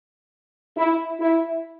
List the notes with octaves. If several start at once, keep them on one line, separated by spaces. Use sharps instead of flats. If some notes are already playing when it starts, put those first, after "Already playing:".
E4
E4